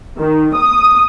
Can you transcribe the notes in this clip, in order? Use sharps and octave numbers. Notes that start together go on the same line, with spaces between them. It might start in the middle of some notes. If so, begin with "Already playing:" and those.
D#3
D#6